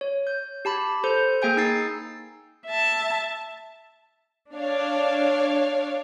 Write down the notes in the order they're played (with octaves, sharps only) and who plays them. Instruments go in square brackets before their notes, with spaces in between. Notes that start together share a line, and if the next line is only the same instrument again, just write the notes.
[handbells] C#5
G6
G4 A5 B5
A4 C5 G6
A#3 G#4 G5 G#5 G6
D#4 E6 A6 C7
[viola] E5 A5
[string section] D4 C#5 F5